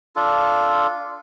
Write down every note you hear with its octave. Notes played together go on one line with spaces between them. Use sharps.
D4 F4 A4